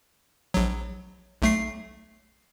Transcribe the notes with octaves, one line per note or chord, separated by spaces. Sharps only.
A#1 F#3
B1 A3 C7